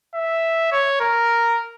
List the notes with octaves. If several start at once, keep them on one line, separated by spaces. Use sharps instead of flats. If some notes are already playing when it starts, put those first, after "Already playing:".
E5
C#5
A#4